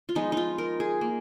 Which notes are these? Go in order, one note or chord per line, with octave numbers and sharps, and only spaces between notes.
F4
F3 G#3 B3 D#4
D#4 F4
A#4
G#4
A#3